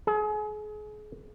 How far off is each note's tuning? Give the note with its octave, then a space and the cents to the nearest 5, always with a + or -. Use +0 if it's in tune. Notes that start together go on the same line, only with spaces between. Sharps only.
G#4 +35